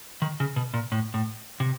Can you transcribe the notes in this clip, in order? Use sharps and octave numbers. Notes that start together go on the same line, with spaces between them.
D#3
C#3
B2
A#2
A2
A2
C3